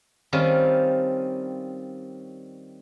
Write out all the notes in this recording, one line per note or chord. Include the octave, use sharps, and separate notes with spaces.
D#3 G3 C4 C#4 F4